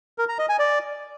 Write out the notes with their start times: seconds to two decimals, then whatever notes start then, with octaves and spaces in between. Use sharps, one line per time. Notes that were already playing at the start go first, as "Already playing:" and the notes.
0.18 A#4
0.29 A#5
0.39 D#5
0.49 G#5
0.59 D5